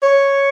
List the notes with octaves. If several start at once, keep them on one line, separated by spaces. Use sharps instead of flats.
C#5